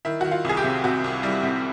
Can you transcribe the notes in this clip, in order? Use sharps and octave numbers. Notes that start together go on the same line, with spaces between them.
D#3 E4
D#3 F#4
F4
C2 G#4
G4
C3
C3 F#4
C2
G3 E4
C3